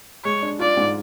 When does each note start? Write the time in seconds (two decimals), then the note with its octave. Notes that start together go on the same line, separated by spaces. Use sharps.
0.24 G#3 C#5
0.42 D4
0.59 F4 D5
0.77 G#2